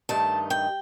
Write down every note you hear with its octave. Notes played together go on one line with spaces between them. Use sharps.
G2 D#3 A3 D#4 A5
G5